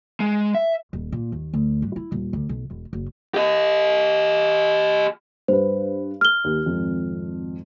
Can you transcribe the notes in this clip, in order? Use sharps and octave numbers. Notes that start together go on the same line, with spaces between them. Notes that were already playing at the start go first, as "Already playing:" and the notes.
G#3
E5
D#1
A#2
D#2
D2
G2
E4
D#1
D2
B1
E1
F#1
G4 D#5
G2 B4 C5
F6 G7
D#2
G#1 F2